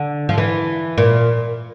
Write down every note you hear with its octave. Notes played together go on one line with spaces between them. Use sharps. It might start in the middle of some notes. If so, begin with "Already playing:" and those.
Already playing: D3
F3
E3
A#2